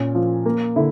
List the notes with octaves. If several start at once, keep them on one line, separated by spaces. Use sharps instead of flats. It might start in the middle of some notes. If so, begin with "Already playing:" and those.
Already playing: A#2 C#4
F3
A#3
D3 E4